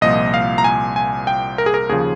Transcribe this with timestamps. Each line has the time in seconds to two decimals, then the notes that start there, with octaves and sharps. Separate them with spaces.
0.01 C2 A#2 F3 D#5
0.34 F5
0.58 A#5
0.64 G#5
0.96 G#5
1.27 G5
1.58 A#4
1.66 G#4
1.74 A#4
1.89 D#2 C#3 F3 G#4